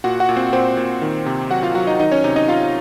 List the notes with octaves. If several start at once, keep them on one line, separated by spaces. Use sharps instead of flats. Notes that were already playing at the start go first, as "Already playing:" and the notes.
A#2 F#4 F#5
F#4 F#5
A#2
C4 C5
A#2 C4 C5
A#2
D#3
C3
F#3 F#4 F#5
F4 F5
F#3 F#4 F#5
D#4 D#5
D#3 D#4 D#5
C#4 C#5
C3 D#4 D#5
D#4 D#5
C3 F4 F5